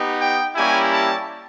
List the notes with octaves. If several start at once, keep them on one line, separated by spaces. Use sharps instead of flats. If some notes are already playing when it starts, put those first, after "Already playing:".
Already playing: B3 D#4 G4
G5
G3 A#3 C#4 E4 G4 G#5
A5